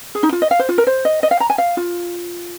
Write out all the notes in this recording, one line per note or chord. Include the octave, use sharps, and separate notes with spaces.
G#4
D#4
F4
D#5
F5
C5
F4
A#4
C5
D#5
D#5
F5
A#5
G#5
F5
F4